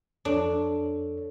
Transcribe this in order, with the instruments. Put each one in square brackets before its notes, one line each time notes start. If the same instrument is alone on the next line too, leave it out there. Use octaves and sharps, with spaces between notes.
[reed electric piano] F2 A4 C#5 [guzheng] D4